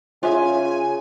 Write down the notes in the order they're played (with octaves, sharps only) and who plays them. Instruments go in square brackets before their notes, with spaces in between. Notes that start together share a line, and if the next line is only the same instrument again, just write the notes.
[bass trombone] C#3 [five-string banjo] F4 G#4 E5 [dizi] G#5